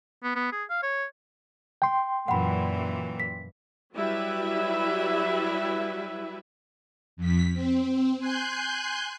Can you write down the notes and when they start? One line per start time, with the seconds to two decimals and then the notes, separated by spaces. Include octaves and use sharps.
0.23 B3
0.35 B3
0.52 G#4
0.70 F5
0.83 C#5
1.82 G5 C6
2.28 F#2 A#2 E3 F#5 B5
3.20 B6
3.95 F#3 G3 E4 B4 E5
7.17 F2 B6
7.54 C4
8.18 G#5 C6 F#6 G6